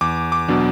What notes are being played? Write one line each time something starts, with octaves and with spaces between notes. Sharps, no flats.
E2 D6
D6
B2 F#3 B3 D4